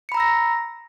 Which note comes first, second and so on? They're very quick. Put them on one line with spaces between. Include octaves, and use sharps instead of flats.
C#7 B5 A#5 E6 A#6